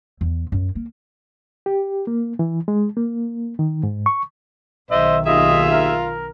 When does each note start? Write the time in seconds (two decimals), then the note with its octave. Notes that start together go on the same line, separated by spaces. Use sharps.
0.21 E2
0.52 F#2
0.75 A#3
1.66 G4
2.07 A#3
2.39 E3
2.68 G#3
2.97 A#3
3.59 D#3
3.83 G#2
4.06 C#6
4.91 B1 D#3 C5 D#5 E5
5.26 D#2 F4 G#4 D#5 E5
5.72 A#4